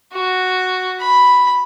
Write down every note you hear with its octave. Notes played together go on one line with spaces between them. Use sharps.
F#4
B5